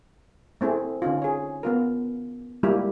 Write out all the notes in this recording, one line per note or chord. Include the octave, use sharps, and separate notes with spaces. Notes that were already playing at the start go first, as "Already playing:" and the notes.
A3 C4 E4 G#4
D3 C#4 D#4 F4
G#4 C#5
B3 F4 A#4
G3 G#3 A#3 E4 F4 G4